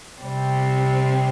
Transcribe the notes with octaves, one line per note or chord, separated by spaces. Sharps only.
C3 G3 C4